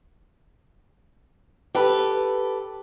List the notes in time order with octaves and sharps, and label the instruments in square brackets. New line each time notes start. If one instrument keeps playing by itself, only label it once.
[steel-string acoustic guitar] G4 A4 B4